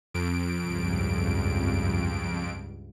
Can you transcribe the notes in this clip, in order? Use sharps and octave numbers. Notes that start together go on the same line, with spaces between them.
F2 D7
C#2 G2